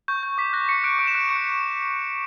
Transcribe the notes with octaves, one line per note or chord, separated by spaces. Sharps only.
C#6 G6
G6
D6 B6
F#6 A#6
C#6 C#7
F#6 D7
D6 D7
E7
F#6 D7
C#6 C#7